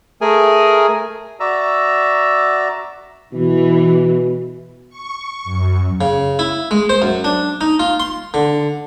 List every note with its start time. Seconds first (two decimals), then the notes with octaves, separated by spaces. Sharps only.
0.21 A3 G#4 A#4 G#5
1.40 F#4 D5 E5 A#5 E6
3.33 B2 E3
4.89 C#6
5.44 F#2
6.01 C#3
6.39 E4
6.71 G#3
6.89 C5
7.02 F#2
7.24 D4
7.61 D#4
7.79 F4
8.00 C6
8.34 D3